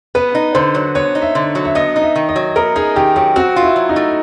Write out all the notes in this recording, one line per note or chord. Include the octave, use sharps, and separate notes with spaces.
B3 B4
D#4
D3 C5
F#3
B3 C#5
D#4
E5
D3
F#3
E5
B3 D#5
D#4
E5
D#3
D#5
F#3
B3 A#4
D#4 G#4
D#3 G4
F#3 G4
C4 F#4
F4
E4
F#3
D#4
A3